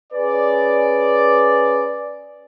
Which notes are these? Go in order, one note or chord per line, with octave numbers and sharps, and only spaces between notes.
C#4 G#4 B4 D5